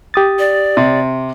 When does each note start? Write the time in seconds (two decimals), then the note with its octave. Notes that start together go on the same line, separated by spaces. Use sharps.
0.14 G4 D#6 A6
0.39 D5
0.77 C3